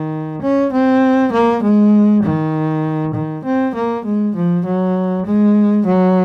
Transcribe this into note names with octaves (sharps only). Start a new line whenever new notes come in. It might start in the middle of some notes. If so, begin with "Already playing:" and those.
Already playing: D#3
C#4
C4
A#3
G#3
D#3
D#3
C4
A#3
G#3
F3
F#3
G#3
F#3